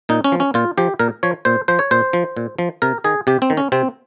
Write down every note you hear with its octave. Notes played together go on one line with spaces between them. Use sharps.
A#2 D#4
C#4
F3
C#4
A#2 F4
F3 G4
A#2 A#4
F3 C#5
A#2 C5
F3 C5
C#5
A#2 C5
F3
A#2
F3
C3 A#4
D#3 G#4
C3 G4
C4
D#3
C#4
C3 C4